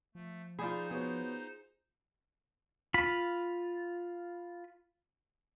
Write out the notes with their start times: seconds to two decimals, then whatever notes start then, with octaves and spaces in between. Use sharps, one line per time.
0.15 F3 A3
0.59 D#4 F4 G#4 C5 D5 B5
0.91 B3 F#4 G#4 C#5
2.94 F4 B5